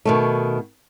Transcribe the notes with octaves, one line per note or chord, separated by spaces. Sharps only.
B2 D#3 A3